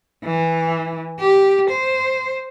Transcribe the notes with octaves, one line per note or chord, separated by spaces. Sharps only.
E3
G4
C5